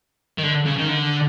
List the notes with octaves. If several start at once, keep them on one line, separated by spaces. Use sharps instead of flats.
D#3
D3
C#3
D#3
D3